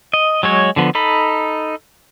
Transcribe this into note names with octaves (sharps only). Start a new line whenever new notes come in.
D#5
F#3 G#3 C#5
D3 F3 B3
D#4 A4 B5